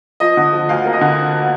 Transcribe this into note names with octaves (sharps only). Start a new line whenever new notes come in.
F3 D#5
D3
F3
D2 F5
A#3
D#5
D3